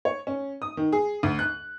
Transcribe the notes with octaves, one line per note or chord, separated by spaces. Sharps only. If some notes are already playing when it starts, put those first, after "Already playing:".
C#5
C#4
D#6
D#3
G#4
D2
F#6